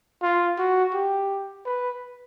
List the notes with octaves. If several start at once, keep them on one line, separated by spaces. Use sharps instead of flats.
F4
F#4
G4
B4